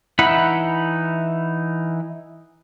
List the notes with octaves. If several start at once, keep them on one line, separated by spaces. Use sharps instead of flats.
E3 D#4 E4 F#5 B5